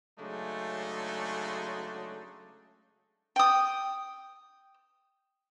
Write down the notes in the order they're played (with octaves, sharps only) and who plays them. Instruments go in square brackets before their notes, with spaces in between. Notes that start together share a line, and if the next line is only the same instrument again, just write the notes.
[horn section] C#3 F#3 G#3 A3 D4 D#4
[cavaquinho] G5 D#6